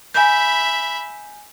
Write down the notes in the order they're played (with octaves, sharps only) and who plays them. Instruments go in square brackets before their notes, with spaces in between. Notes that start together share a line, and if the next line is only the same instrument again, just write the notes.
[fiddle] E5 B5 [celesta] G#5 G6